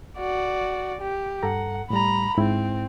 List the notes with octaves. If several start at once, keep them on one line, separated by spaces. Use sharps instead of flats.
F#4 D5
G4
G2 A4 F#5 A#5
A2 G3 A#5 B5
G#2 C4 E4